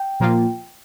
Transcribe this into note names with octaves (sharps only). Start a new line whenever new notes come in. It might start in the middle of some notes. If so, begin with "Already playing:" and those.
Already playing: G5
A#2 F3 A#3 F4